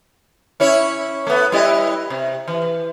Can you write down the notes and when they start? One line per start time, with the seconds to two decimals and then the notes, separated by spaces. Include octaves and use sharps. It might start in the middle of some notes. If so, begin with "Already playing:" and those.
0.60 C#4 E4 C#5
1.27 A3 B3
1.52 G3 E4 D#5
2.10 C3
2.48 E3